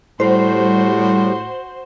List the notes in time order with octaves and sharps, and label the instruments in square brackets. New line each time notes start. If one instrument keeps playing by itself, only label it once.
[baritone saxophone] A2 [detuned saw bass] G3 [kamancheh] F#4 C6 [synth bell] C5